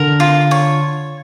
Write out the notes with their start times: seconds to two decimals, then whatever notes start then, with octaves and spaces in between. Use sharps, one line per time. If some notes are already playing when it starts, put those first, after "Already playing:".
Already playing: D3 A#4
0.20 F4
0.51 C#5